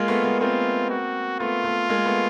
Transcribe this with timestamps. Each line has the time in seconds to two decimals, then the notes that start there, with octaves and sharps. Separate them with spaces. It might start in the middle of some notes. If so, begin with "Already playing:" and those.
Already playing: G#3 A#3 F4
0.08 A3 B3
0.24 A3 B3
0.40 A#3 C4 F4
0.90 F#4
1.40 A3 B3 F4
1.64 A3 B3
1.89 G#3 A#3
2.05 A3 B3